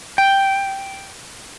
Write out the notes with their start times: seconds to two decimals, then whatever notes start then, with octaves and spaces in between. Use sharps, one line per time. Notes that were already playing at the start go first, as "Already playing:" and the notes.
0.18 G5